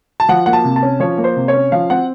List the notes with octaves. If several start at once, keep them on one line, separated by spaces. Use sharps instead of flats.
A5
F3 F#5
A#3 F#5
A5
C3
A5
C#4
F3 C#5
A#3
C5
C3
C#5
C#4
F3 F5
C4 F#5